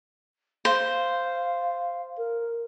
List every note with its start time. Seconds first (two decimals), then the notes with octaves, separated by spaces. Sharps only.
0.65 C5 F5
2.17 A#4